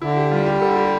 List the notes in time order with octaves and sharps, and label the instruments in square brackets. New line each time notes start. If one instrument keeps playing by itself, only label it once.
[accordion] D3 [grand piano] E4
[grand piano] G4
[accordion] G3 [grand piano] F4
[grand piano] G4
[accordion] D3 [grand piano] A4
[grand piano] G4